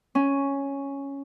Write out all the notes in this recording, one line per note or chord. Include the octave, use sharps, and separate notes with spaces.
C#4